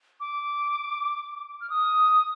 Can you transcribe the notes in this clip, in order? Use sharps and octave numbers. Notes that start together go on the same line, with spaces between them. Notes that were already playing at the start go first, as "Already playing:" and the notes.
D6
F6
D#6